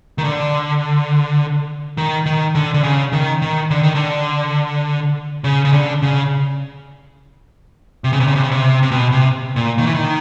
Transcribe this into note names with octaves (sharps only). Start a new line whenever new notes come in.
D#3
D3
D#3
D#3
D3
D3
C#3
D#3
D#3
D3
D#3
D3
C#3
C#3
D3
C#3
C3
C#3
C3
C#3
C3
C#3
C3
C3
B2
C3
A#2
D#3
E3
D#3